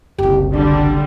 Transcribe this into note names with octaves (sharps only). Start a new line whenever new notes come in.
F#1 C2 G4
D3 G3 D4